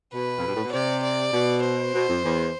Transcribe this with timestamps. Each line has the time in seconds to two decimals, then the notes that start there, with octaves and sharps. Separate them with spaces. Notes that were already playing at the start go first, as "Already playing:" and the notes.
0.13 B2 B4
0.38 F2
0.48 G2
0.56 A2
0.64 B2
0.73 C3 D5
1.03 D5
1.33 B2
1.63 C5
1.93 B2
2.08 F2
2.24 E2